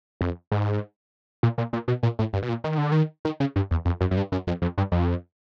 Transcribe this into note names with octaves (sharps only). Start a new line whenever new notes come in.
F2
G#2
A#2
A#2
A#2
B2
A#2
A2
G2
B2
A#2
D#3
D3
D#3
D#3
C#3
G2
E2
F2
F#2
F#2
G2
F#2
F2
F2
G2
F2